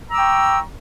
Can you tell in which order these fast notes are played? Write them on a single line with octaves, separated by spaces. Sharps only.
A#5 E6 D6 C#6 G5